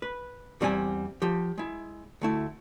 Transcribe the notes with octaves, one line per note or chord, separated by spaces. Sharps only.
B4
E2 G3 C4 C#4 G#5 A5
F3 G4
G#3 E4
D2 A3 E4